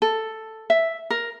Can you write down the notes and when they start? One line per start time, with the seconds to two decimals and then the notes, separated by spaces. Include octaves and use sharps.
0.02 A4
0.70 E5
1.10 A#4